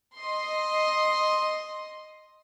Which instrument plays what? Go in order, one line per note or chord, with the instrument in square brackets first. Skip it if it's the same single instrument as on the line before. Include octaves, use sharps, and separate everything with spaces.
[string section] D#5 C6